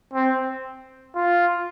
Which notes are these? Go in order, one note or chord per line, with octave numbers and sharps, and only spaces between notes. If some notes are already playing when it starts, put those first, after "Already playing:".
C4
F4